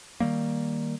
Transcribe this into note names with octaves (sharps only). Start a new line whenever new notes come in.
D#3 F3 G3 A#3